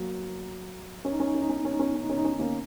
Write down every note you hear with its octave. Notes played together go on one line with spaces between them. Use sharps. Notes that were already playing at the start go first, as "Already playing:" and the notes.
Already playing: F#3 A#3
C#4
D#4
C#4
D#4
C#4
D#4
C#4
D#4
C#4
D#4
C#4
D#4
C#4
D#4
C#4
D#4
C#4
D#4
A#3 C#4